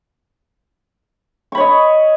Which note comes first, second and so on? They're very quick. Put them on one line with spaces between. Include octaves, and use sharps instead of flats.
C#6 B5 C#5 D#5